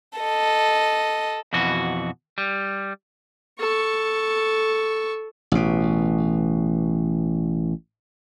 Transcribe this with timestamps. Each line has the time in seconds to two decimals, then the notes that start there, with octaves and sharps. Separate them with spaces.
0.19 A4 D#5
1.53 F2 B2 E3 F#4
2.38 G3
3.60 A4 C#6
5.52 A1 B2